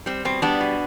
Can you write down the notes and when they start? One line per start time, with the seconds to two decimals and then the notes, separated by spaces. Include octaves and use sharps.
0.06 G3 C4
0.25 B2 C4
0.42 G3 B3 D4
0.61 B2